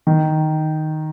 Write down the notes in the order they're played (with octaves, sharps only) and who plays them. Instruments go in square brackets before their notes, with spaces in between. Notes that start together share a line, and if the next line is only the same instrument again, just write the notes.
[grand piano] D#3